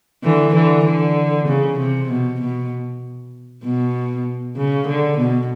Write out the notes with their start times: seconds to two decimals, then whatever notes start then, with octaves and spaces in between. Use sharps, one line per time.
0.23 D3 E3
0.54 D3 E3
0.85 D3
1.48 C#3
1.79 C3
2.10 B2
2.40 B2
3.63 B2
4.56 C#3
4.87 D3
5.18 B2